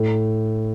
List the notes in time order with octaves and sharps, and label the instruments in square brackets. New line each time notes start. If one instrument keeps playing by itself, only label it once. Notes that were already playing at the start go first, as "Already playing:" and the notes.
Already playing: [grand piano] A2